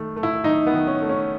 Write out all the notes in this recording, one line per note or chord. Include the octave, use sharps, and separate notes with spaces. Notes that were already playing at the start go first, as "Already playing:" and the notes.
Already playing: D#3 A3
A3
E4
D#3 D#4
B3
D#3
C#4
A3
C#4